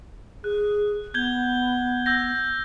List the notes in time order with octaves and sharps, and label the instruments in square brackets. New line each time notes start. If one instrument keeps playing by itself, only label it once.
[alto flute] G#4 [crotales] F#6
[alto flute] B3 [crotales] G6 G#6 G7
[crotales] E6 G6 A#6